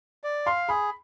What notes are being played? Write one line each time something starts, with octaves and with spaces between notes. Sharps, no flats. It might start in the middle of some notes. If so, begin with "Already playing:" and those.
D5
F5 C6
G#4 B5